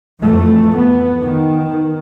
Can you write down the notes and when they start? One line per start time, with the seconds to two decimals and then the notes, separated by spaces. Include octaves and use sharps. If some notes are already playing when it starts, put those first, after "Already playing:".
0.21 F2 E3 A3
0.74 B3
1.22 D#3